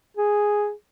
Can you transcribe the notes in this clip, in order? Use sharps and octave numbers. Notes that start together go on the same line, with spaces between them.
G#4